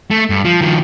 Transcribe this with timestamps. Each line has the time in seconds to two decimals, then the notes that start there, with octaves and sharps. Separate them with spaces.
0.11 A3
0.30 G2
0.45 F3
0.61 D#3 F3